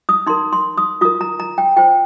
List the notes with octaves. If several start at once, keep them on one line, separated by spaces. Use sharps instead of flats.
D#6
D#4 A#4 C6
C6
D#6
F4 A#4 D#6
A#5
A#5
G5
F4 C5 G5